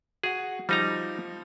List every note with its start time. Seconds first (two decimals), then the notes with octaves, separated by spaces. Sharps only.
0.24 F#4 G#4 F#5
0.69 F3 G3 D#4 A#5